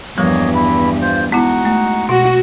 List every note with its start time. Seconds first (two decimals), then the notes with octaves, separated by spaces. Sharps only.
0.18 E2 G2 F3 G3 A#3 C#5 D#5
0.55 E4 B5
1.02 F4 C5
1.32 G#3 B3 D#4 E4 F#4 F#5
1.65 A3
2.09 B2 F#4